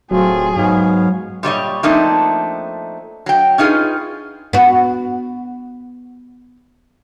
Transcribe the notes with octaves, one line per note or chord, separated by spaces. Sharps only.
D1 F#3 A3 C4 F4 G#4
G#2 B3 C#5 F5
A#2 G3 C#5 D#5
F3 A3 A#3 C4 D4 D#4
F#3 G5
C#4 D#4 F4 G#4 B4
B3 F#4